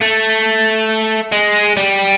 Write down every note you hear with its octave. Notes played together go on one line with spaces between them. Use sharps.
A3
G#3
G3